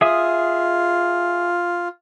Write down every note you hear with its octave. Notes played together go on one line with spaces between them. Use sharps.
F4 G#4 E5 D#6